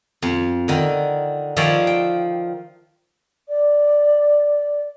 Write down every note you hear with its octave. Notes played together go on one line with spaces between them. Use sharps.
F2
D3 D#3
D#3 F3 C#5 D5 E5
G5
D5